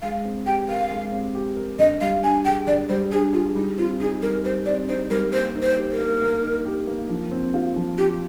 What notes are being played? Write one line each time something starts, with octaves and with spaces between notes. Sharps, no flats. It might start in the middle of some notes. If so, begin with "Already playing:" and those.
G#3 F5
C4
G4 G5
A#4 F5
G#3
C4
G4
A#4
D3 D#5
G3 F5
D4 G#5
G#4 G5
D3 D5
G3 C5
D4 G#4
F4 G#4
G3 D#4
C4 F4
D#4 G#4
G3 A#4
G3 C5
C4 D5
D#4 C5
G3 A#4
A#3 C5
D#4
C5
G4
A#4
A#3
A#3
D#4
G4
A#3
F3
C4
F4
F3
F3 G4